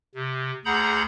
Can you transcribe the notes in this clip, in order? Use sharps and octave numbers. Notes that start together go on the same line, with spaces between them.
C3
D2 G#4 F#5 A#5 B5 G6